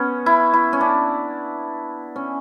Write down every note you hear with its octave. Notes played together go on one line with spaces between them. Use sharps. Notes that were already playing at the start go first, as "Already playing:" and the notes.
Already playing: B3 C#4
E4
E4
C#4
D4
C#4